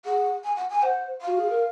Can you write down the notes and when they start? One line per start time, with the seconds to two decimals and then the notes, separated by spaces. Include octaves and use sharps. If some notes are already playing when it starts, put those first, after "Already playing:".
0.05 G#4 F#5
0.44 G#5
0.56 F#5
0.70 G#5
0.82 C5 F#5
1.21 F5
1.27 F#4
1.38 G#4
1.50 A#4